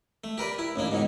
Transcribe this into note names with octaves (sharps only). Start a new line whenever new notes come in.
A3
G4 A#4 B4 D5
E4
A1 D#2 A#3 D4
G#2 B2 D#3